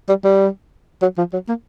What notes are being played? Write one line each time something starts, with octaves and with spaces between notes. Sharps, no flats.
G3
G3
F#3
F3
F#3
A#3